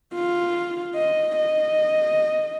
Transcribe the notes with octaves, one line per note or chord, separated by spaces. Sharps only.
F4
D#5
D#5